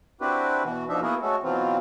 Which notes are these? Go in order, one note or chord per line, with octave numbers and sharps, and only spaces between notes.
C4 D4 E4 F#4 G4 B4
B2 E3 F#4
B2 F3 D4 D#4 E5
A#3 B3 E4 F#4 G#4 A#4
G#3 A3 C#4 F#4 A4
B2 E3 F#3 C4 F4